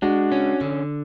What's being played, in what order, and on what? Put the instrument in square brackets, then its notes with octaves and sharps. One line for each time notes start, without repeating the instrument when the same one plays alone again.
[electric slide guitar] G#3 [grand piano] D4 F#4
[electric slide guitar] C#4
D3